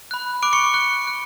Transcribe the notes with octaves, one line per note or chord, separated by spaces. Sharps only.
B5 F#6
B5 D6 F#6 D7
C#6 C#7
C#6 F#6
C#6 F#6